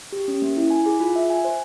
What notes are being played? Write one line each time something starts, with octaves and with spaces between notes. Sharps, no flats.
G4
C#4
A#3
E4
G#5
G#4
F4
E5
G#5
C5